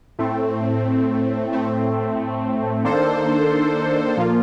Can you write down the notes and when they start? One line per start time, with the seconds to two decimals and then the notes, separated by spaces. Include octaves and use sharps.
0.19 A2 A3 C4
1.51 A2 A3 C4
2.84 D#3 A#3 D4 A4 C5
4.17 A#2 F3 A#3 F4